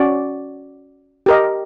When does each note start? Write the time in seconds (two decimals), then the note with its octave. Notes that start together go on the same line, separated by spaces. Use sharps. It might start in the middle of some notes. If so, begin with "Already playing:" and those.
Already playing: C#4 F#4 D5
1.26 G4 A#4 D#5